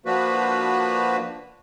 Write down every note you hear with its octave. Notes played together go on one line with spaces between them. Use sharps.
F3 A#3 D4 F#4 B4